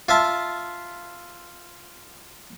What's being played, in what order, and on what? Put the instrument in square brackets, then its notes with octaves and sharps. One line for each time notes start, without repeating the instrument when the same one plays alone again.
[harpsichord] F4 E5 A5